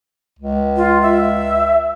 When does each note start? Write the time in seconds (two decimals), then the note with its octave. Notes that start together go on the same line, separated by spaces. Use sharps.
0.39 C#2
0.77 F4
1.02 E5